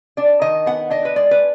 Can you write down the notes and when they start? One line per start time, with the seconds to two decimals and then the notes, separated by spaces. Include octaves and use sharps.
0.17 D4 D5
0.42 D#3 D#5
0.66 B3 F#5
0.91 D4 D#5
1.05 B4
1.16 G#3 D5
1.31 B4